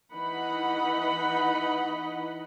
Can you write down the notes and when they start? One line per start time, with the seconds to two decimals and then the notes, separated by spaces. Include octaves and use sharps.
0.13 E3 D#4 D#5 F#5 B5